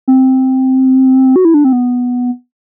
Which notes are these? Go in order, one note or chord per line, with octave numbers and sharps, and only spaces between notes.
C4
F#4
E4
D4
C4
B3